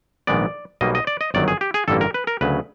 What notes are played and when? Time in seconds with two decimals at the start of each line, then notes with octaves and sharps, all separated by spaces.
0.27 A#1 G#2 D#3 G#3 B3 D5
0.81 B1 B2 G3 A#3 D#5
0.95 D#5
1.07 D5
1.21 D#5
1.34 G1 F#2 D#3 F#3 D5
1.48 G#4
1.61 G4
1.74 G#4
1.88 A1 G2 D3 G3 A#3 A4
2.01 A#4
2.14 B4
2.27 A#4
2.41 D2 C#3 F#3 B4